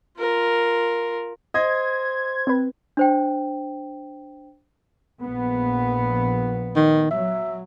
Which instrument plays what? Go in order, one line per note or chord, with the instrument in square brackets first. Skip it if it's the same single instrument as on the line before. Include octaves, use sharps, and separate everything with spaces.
[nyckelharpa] F4 A#4
[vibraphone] C5 C6 [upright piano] D#5 [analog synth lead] G#6
[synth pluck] C4 B4
[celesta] D4 C5 G5
[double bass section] A#1 B3
[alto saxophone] D#3
[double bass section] F#3 [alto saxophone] E5